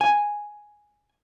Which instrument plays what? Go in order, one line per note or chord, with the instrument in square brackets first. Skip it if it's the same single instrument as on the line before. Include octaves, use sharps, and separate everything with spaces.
[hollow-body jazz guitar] G#5